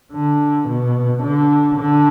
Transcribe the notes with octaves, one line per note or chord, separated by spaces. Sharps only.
D3
B2
D3
D3